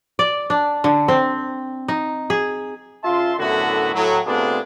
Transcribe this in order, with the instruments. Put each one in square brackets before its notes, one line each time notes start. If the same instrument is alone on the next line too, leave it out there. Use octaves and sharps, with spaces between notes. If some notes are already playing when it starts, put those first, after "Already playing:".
[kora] D5
D4
D3
C4
D#4
G#4
[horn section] C#3 F4 E5 A5 C6
F#2 A2 D3 B3 E4 F#4
A2 F#3
C3 A3 B3 D4 F4 G#4